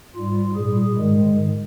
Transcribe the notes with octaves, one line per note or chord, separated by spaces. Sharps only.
G#2 G3 F4
A#2 G3 G#4
G#2 D#3 G#3